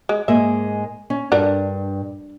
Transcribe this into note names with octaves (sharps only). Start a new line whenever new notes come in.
G#3
G#2 G#3 A#3 E5
C#4
G2 D4 A4 A#4